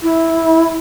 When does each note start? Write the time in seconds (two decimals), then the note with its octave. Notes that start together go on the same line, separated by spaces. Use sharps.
0.02 E4